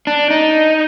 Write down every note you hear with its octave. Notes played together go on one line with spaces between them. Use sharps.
D4
D#4